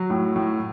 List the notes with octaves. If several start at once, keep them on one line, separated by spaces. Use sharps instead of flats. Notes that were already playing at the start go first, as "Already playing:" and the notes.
Already playing: F#3
A2
A2